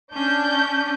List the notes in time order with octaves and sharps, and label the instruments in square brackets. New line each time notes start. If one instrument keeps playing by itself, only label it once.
[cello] C#4 [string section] D4 G6